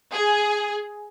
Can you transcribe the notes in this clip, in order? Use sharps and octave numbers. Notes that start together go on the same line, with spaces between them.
G#4